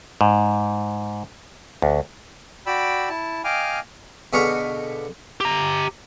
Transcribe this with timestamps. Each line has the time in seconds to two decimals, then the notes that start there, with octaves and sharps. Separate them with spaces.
0.21 G#2
1.82 D2
2.66 F#4 D5 G5 B5 E6
3.09 E4 A5
3.44 D#5 F5 G5 G#5 D6 F6
4.33 B2 D3 G#4 F5 C#6
5.40 G4 A#5